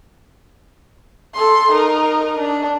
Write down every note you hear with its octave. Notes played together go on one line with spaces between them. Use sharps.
A4 C6
D#4 A#4
D4